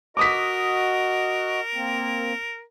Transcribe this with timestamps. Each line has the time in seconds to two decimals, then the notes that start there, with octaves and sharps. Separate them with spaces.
0.17 F#4 A#4 D#5 D6 D#6 B6
1.74 A#3 C4